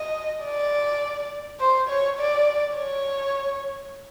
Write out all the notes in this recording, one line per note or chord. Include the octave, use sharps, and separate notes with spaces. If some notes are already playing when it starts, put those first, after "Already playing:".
Already playing: D#5
D5
C5
C#5
D5
C#5